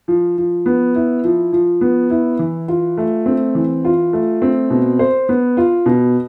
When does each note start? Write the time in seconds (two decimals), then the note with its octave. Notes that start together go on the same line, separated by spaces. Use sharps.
0.08 F3
0.38 F3
0.66 B3
0.95 E4
1.24 F3
1.53 F3
1.81 B3
2.10 E4
2.39 E3
2.68 F4
2.98 A3
3.26 C4
3.55 E3
3.85 F4
4.13 A3
4.42 C4
4.70 B2
4.99 C5
5.29 B3
5.57 F4
5.86 B2